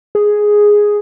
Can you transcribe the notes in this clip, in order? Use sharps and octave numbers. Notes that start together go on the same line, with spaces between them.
G#4